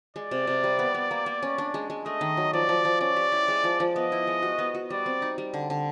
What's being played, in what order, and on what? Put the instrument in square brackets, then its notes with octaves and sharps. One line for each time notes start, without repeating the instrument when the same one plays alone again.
[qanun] G#3 [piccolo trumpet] D5
[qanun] C3
C3
G3
B3
B3
A#3
A#3
C#4
D4
G#3
G#3
[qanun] A3 [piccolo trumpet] D#5
[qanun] D#3
F#3
[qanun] F3 [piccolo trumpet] D5
[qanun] F3
F3
[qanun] C#4 [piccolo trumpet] D5
[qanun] G4
E4
G#3
F3
F3
[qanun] B3 [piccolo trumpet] D#5
[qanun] E4
G#3
F#4
B3
F#4
[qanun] G3 [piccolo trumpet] D5
[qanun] C4
D#4
G3
D3
D3